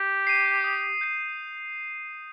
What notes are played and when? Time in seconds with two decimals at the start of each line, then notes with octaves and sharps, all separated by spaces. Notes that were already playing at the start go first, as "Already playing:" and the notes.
Already playing: G4
0.27 C7 D#7
0.64 D#6
1.01 G6 C7